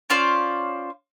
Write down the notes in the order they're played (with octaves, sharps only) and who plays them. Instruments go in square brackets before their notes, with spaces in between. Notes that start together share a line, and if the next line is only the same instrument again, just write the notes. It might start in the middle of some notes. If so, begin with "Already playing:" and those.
[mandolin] C#4 F4 C5 D5